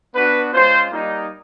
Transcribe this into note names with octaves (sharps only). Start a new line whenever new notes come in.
B3 D4 F#4 B4
G#3 C#4 F4 C5
G3 A#3 D#4